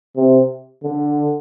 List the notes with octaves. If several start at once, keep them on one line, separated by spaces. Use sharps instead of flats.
C3
D3